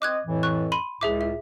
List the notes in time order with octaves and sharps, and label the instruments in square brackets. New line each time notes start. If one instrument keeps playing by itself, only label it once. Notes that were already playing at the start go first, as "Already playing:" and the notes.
[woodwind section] C4 D#5 [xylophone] D6 F#6 G#6
[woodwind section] F2 A2 E3
[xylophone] C#6 F#6
B5 C6 D#7
[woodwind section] C#2 A2 [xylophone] G#4 E5 D6
[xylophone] E5